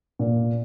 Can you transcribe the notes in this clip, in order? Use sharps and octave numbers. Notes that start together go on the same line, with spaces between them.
A#2